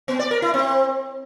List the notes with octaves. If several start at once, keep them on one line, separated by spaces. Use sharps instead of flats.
B3
D5
A#4
E4
C4